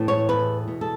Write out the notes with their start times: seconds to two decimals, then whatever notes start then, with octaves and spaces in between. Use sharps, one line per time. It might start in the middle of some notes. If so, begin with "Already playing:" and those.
Already playing: A2 E3
0.08 C#5
0.29 E2 B4
0.68 B2
0.81 A4